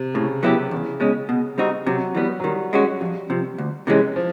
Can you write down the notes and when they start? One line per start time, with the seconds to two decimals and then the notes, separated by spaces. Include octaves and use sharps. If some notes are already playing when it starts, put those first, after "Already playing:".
Already playing: C3
0.14 A2 C#3
0.43 F#3 B3 E4 G4
0.71 E2 C#3
1.00 B2 G#3 C#4
1.29 B2
1.58 G3 C4 D#4 F#4
1.86 C3 F#3
2.15 E3 G3 B3
2.40 F#3
2.44 D#3 G3
2.73 G#3 C#4 F#4
3.01 F2 G3
3.30 C3 F3
3.58 D2
3.87 C3 E3 G#3 C#4
4.16 F3